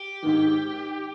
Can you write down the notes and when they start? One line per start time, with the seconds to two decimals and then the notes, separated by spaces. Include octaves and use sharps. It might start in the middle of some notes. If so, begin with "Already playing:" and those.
Already playing: G4
0.22 G#2 D#3